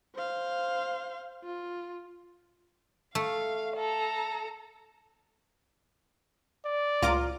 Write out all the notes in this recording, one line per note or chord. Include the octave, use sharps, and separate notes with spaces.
C5 F5
F4
A3 F5
A4 A#5
D5
C#2 F4 A#5 D6